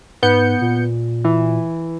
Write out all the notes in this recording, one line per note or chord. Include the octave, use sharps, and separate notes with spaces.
G#2 B3 G6 C#7
A#2
E3